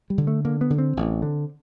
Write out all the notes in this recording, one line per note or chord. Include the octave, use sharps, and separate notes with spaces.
G3
D3
A3
D3 A#3
B3
D3
C4
A1
D3